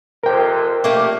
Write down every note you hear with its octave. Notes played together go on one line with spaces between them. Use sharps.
F2 C3 A#4 C5 G5
A#1 A3 A#3 G4